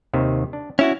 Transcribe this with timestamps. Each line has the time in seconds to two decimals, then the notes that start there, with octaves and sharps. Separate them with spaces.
0.13 D#2 C3 D#3
0.53 D4
0.79 C#4 E4 F#4 E5